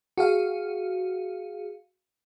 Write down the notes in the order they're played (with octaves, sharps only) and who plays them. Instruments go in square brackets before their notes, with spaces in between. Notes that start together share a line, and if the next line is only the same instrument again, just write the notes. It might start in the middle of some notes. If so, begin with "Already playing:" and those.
[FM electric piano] F#4 G#4 F5